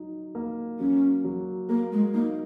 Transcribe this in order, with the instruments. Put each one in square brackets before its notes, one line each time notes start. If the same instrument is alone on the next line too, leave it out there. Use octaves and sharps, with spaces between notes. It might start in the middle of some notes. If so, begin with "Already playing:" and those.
Already playing: [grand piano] F#3 D#4
A#3
[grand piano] F#3 [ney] C#4
[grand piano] F#3
[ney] A#3 [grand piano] A#4
[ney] G#3
[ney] A#3 [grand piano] D#4